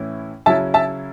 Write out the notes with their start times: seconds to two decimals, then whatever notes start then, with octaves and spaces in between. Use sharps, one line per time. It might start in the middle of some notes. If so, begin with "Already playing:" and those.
Already playing: A2 E3 C#4 E4
0.46 C#3 F#3 C#4 E4 E5 A5
0.74 E5 A5